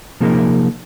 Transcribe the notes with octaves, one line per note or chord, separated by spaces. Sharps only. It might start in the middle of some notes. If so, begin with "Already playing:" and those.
C3 F3 A#3 D#4 G#4 A#4